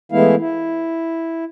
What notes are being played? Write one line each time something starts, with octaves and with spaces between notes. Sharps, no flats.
E3 G#3 A3 B3 E4 F5
E4